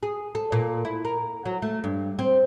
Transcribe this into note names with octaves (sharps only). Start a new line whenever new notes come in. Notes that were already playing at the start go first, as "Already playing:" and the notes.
G#4
A4
A#2
E4
A#4
F#3
A3
G2
C4